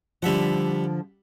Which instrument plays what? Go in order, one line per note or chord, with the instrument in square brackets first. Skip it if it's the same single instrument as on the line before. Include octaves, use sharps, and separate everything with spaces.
[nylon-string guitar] D3 F3 [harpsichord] G3 E5 F#5